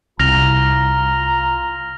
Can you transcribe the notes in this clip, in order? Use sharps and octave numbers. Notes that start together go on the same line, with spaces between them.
C2 F4 A#5 F6 A#6 F7